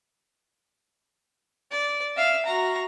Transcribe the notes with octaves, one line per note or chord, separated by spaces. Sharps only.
D5
E5 F5
F#4 A#5